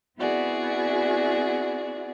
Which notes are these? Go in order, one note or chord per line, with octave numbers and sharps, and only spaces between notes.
B3 C4 E4 F#4 G#4 D5